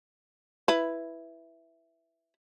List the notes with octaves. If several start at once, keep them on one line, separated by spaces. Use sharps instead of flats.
E4 B4